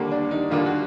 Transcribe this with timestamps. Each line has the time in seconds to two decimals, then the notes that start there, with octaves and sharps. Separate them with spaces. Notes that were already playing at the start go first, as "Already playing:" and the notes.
Already playing: D#2 D3 G3 A#3
0.11 D4
0.31 D#4
0.51 D#2 D3 G3 A#3 F4
0.66 F#4